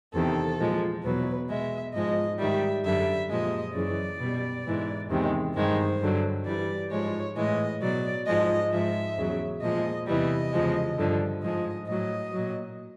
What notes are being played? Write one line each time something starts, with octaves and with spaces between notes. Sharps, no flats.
E2 C3 D#3 A4
A#2 F3 G#3
E2 B2 F#3 B4
B2 G#3 E5
G#2 F3 G#3 D#5
G#2 D#3 G3 E5
F#2 D3 G3 E5
A#2 F3 G#3 D#5
F#2 C#3 E3 D5
B2 G3
G#2 E3 G#3
E2 C3 D#3 G#3
G2 D#3 G#3 C5
G2 D3 F#3
G2 E3 G3 D5
G#2 F3 G#3 C#5
A2 E3 G#3 D#5
B2 F#3 D5
G#2 F3 G#3 D#5
G#2 F3 G#3 E5
E2 C#3 F#3
A#2 F3 G#3 D#5
E2 C3 E3 G3 D#5
E2 C#3 F3 G#3
G2 D3 F3
G#2 F3 G#3 D#5
A2 F#3 D#5
A#2 F#3